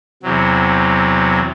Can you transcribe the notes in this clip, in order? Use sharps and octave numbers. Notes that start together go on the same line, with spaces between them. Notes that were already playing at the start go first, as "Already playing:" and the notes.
E2 C3 F#3